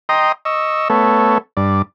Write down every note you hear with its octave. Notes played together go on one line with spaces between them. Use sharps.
D#5 G5 A#5 C6 D#6
D#5 C#6 E6
A3 B3 A4 C#5
G2 D5